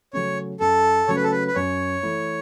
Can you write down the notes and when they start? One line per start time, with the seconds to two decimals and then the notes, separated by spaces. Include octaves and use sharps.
0.13 C#3 F#3 A3 C#4 C#5
0.60 F#2 A4
1.08 C#3 F#3 A3 C#4 C#5
1.16 B4
1.23 A4
1.31 B4
1.48 B4
1.55 F#2 C#5
2.03 E3 A3 E4